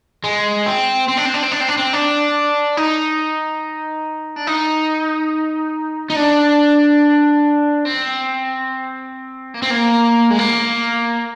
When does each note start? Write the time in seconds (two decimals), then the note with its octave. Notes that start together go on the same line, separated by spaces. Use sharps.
0.24 G#3
0.66 C4
1.08 C4
1.18 D4
1.26 C4
1.34 D4
1.43 C4
1.52 D4
1.61 C4
1.69 D4
1.77 C4
1.93 D4
2.77 D#4
4.36 D4
4.47 D#4
6.10 D#4
6.16 D4
7.85 C4
9.54 A#3
9.62 C4
9.70 A#3
10.30 G#3
10.39 A#3